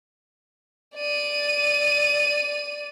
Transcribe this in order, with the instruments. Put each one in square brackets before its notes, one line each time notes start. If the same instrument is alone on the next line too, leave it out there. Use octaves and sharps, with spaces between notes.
[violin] D5 D#7